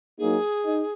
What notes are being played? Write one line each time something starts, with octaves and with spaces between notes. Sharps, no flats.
F#3 A#3 D#4 G#4
D#4